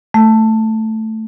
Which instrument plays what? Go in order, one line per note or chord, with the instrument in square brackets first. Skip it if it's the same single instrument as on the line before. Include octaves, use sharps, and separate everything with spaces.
[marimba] A3